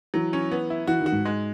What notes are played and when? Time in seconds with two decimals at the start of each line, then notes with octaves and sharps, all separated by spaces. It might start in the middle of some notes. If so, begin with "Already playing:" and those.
0.14 E3 F#3
0.33 C#4
0.51 B3
0.70 E4
0.88 E3 F#4
1.00 D#3
1.06 F#4
1.12 G#2
1.25 G#3